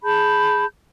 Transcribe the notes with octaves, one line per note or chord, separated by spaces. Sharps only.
G#4 A5 B5 G6